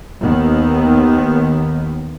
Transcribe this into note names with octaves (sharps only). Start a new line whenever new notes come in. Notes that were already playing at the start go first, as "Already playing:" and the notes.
D#2 D#3 B3